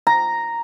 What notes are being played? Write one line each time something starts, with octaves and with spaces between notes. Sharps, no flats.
A#5